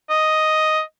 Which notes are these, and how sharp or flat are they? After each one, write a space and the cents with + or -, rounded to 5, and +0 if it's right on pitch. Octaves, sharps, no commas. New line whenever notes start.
D#5 +5